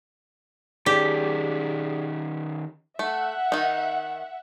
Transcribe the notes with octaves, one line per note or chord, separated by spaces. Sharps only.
D#3 C#4 G4 G#4 D5 B6
A3 E5 F#5
D#3 D#4